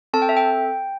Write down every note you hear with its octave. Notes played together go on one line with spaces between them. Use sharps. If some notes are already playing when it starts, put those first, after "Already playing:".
C4 A4 A5
G5
E5
G5